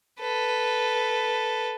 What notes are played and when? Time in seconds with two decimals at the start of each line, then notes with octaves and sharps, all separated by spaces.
0.20 A4 B4